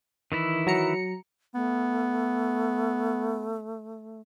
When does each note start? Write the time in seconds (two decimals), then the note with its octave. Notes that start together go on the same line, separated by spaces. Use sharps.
0.32 D#3 E3 E4
0.67 F#3 A#5 C#7
1.54 A3 B3